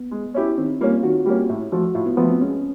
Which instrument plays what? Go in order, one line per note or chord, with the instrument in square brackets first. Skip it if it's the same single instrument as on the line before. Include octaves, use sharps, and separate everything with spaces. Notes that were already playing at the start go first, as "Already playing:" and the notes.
Already playing: [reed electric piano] B3
[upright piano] G#3
C#4 E4 G4
[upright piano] D#3 [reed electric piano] C4
[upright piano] G3 A#3 C#4 [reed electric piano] F4
[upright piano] D#3 [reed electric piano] F#4
[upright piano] G3 A#3 C#4 [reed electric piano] G4
[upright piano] A2
[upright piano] F3 A3 [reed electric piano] F#4
[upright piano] A2 [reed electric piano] F4
[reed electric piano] B3
[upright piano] F3 A3 [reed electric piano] B3
[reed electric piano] C4
[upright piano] G#3 [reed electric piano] C#4